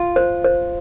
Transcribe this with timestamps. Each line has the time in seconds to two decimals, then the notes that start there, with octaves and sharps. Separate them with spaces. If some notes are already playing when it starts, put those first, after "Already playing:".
Already playing: F4
0.16 C5
0.44 C5